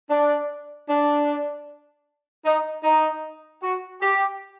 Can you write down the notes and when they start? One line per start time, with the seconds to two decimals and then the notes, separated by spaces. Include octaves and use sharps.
0.11 D4
0.89 D4
2.45 D#4
2.84 D#4
3.62 F#4
4.02 G4